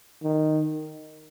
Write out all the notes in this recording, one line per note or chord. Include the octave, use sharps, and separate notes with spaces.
D#3